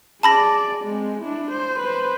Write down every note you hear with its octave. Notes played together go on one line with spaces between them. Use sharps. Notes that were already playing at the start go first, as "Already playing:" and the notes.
G#4 D5 A5 B5 A#6
G#3 C4
D4 E4
C5
B4 C5